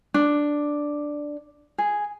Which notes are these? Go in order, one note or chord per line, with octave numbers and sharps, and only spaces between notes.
D4
G#4